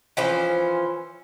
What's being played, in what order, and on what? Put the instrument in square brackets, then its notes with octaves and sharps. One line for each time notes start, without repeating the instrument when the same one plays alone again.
[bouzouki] E3 F3 C#4 C5